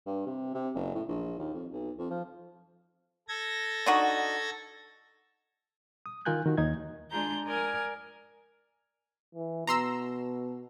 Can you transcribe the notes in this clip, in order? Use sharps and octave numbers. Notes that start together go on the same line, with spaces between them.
G2
C3
C3
F#1
A2
A#1
D#2
F2
B1
F2
F3
A4 G#6 A#6
D3 D#4 F#4
D#6
D#3 F4 A#4 G#5 F#6 G6
D#3 F#4
D#2 D#4 D#5 G#6
G#3 D4 F4 G#4 A#5 G6
A#4 D5 G#5 D#6 F6 G#6
E3
B2 A#5 C6 E6